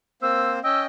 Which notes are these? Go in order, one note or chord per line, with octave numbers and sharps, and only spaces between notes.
A#3 C4 C5 E6
C#4 D#5 G5 E6